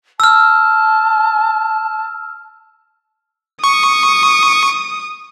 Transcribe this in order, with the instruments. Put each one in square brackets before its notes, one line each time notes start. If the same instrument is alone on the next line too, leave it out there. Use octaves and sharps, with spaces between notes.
[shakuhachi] A5 [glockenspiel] E6 F6
[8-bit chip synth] C#6 [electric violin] D#6